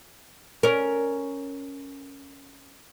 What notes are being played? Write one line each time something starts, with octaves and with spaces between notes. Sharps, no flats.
C#4 A#4